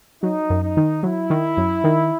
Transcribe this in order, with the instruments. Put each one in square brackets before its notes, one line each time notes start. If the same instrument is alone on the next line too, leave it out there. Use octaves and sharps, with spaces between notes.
[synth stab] F#3 [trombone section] D#4
[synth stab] F#2
[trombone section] D#4
[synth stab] D#3
[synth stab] F#3 [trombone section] E4
[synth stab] D#3
F#2
D#3